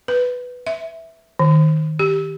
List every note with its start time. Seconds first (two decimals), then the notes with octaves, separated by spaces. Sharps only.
0.08 B4
0.67 E5
1.39 D#3
1.99 G4